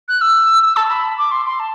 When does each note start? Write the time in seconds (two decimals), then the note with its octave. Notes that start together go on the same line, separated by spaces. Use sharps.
0.09 F#6
0.21 E6
0.63 E6
0.77 A5
0.90 B5
1.18 D6
1.31 C6
1.46 C6
1.60 A5